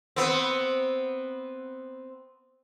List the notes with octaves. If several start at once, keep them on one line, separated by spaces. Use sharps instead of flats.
B3 C4